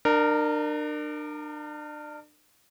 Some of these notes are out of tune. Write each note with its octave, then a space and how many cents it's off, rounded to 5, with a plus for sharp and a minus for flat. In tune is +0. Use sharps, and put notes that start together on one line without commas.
D4 +35 A#4 -10